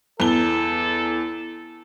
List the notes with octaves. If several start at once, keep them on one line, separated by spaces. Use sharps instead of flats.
E2 A4 G7